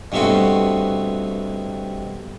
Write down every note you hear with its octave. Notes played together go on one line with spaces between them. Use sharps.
G2 B2 G3 A3 C4 F#4